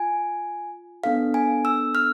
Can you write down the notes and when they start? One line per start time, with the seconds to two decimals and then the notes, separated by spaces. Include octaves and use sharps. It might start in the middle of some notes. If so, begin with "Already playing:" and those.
Already playing: F4 G#5
1.04 B3 D4 A4 F5
1.34 G#5
1.65 E6
1.95 F6